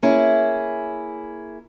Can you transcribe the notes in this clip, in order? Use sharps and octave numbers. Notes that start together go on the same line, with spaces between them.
A#3 C#4 E4 G#4